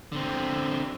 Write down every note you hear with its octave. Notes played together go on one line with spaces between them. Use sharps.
D3 C4